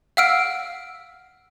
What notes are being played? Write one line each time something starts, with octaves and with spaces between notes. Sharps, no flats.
F5 F#5 E6 F6 D7